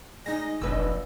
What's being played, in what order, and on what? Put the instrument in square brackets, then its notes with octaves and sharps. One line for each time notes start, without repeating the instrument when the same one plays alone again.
[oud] G#3 [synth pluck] D#4 A#6 [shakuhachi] D#5
[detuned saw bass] F1 [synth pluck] A#1 E6 [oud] F#2 A#2 B4